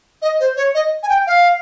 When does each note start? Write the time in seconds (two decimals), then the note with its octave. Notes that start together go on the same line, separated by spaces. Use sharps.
0.22 D#5
0.40 C5
0.57 C#5
0.75 D#5
1.03 G#5
1.09 G5
1.27 F5